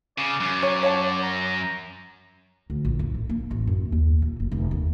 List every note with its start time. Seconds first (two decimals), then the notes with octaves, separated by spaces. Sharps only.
0.18 C#3 D5
0.40 F#2
0.63 C#5
0.83 C#5 F#5 A5
1.23 A#5
2.70 D2
2.85 A#1
2.99 F2
3.14 A2
3.29 A#3
3.51 A1
3.67 F#2
3.92 D#2
4.22 A#2
4.40 F#1
4.51 F1
4.71 D#2